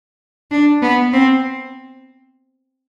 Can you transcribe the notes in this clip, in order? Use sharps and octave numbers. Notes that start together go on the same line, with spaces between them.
D4
B3
C4